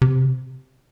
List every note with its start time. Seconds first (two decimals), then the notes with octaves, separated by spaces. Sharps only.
0.02 C3